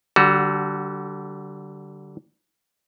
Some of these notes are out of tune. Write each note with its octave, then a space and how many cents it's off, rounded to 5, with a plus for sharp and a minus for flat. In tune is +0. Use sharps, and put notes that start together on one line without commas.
D3 +0 G3 -30 F#4 +0